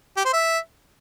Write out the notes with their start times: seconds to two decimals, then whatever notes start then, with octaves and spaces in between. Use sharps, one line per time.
0.17 G4
0.25 C5
0.33 E5